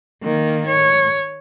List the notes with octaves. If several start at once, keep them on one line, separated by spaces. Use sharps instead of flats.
D#3 A#3
C#5